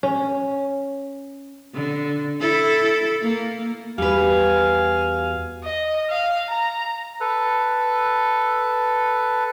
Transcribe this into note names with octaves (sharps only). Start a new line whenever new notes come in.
C#4
D3
E4 A4
A#3
E2 G3 F#4 B4 F5 G#5
D#5
F5
A#5
A4 B4